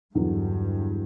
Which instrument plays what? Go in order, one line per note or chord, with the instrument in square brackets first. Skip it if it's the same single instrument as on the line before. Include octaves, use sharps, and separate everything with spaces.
[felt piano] E2 D3 F#3 [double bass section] G2